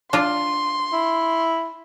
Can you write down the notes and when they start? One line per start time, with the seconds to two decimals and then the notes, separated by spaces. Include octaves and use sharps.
0.13 D4 F4 C6
0.93 E4